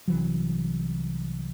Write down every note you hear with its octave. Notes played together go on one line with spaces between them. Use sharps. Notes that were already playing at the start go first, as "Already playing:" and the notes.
C2 E3 F#3